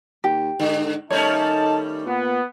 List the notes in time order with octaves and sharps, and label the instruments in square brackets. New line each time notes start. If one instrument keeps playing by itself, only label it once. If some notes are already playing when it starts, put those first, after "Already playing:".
[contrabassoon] D#2 [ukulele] G4
[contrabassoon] G#2 [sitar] D3
[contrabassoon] D#3 [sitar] G3 A3 C#4 [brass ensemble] D#4 A5 [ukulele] C#5
[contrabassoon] A#2 [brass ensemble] B3